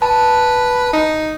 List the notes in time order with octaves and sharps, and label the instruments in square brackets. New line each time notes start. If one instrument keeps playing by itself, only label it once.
[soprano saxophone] B4 [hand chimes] A5
[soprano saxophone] D#4